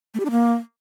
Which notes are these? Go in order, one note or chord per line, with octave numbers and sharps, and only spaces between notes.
A3
G4
D4
A#3